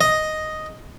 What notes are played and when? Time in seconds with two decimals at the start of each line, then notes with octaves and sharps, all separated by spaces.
0.01 D#5